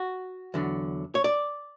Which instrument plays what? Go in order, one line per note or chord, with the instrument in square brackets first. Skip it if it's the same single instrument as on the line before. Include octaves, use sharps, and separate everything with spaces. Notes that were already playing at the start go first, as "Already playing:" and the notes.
Already playing: [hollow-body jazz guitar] F#4
E2 D3 F#3
C#5
D5